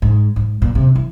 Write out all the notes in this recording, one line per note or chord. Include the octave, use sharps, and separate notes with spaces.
G#2
G#2
A#2
C3
E3